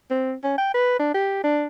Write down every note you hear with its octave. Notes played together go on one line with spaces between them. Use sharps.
C4
C#4
G5
B4
D4
G4
D4